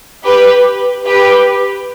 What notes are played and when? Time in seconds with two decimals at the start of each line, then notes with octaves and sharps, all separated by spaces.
0.24 G4 B4
1.06 G4 B4